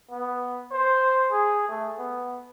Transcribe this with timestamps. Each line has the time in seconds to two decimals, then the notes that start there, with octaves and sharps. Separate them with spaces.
0.10 B3
0.71 C5
1.31 G#4
1.69 A3
1.98 B3